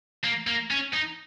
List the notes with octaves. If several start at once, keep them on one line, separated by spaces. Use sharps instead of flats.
A#3
A#3
C#4
D#4